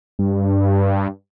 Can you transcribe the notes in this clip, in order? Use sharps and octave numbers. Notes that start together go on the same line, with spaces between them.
G2